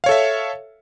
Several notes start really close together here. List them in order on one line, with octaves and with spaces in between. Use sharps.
F5 C#5 A4 E5